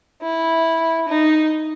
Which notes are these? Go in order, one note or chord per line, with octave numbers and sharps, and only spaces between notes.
E4
D#4